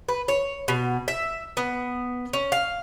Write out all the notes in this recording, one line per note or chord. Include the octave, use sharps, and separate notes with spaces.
B4
C#5
B2
E5
B3
C#4
F5